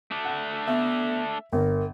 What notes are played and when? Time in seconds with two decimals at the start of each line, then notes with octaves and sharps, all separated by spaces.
0.11 A3 D4
0.25 F#5
0.68 B3 E5
1.53 G1 A#4